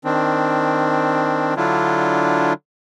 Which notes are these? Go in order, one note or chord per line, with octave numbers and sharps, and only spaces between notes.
D#3 C4 D4
D3 F#3 D4 E4 F4